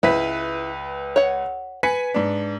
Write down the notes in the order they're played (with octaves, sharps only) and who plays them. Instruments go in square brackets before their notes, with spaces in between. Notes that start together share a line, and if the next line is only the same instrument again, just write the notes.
[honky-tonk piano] C#2 B4 B6 [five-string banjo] E4
[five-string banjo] C#5 F#5
[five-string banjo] B4 [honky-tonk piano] G#5 B6 C#7
[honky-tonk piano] G#2 D4